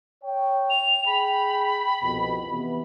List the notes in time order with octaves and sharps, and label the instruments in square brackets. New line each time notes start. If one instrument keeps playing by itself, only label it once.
[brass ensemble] C#5 G5
[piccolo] F7
[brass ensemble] G#4 G5 [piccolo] B5
[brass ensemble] C2 F2 B2
C3 E3 B3